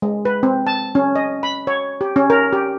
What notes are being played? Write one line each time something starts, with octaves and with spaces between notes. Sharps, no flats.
G#3
B4
C4
A5
C#4
D#5
B5
C#5
G4
C#4
A#4
G4